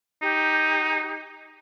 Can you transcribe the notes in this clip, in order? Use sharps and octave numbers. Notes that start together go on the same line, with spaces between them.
D#4 G4